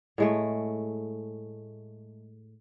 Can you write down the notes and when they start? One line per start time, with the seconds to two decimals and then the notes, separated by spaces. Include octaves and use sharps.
0.18 A2 G#3 A3